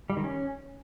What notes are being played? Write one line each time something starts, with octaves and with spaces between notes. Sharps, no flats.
G3
D#3
C#4